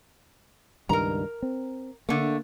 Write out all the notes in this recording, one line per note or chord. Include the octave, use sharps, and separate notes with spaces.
C#2 G2 D#3 A#4 A#5
C4
D3 A3 A#3